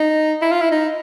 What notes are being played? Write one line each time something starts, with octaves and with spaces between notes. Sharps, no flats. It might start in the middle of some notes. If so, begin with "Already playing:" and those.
Already playing: D#4
E4
F4
E4
D#4